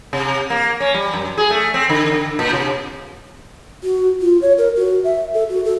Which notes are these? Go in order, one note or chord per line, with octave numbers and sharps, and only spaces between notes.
C3
A#3
C#4
G3
F#2
G#4
A3
C4
D3
D3
A#2
C3
F#4
F4
C#5
A#4
F#4
E5
A4
F#4
A4